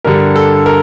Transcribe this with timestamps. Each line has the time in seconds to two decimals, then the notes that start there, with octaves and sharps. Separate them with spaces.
0.05 G2 D3 G3 A#4
0.36 A4
0.66 A#4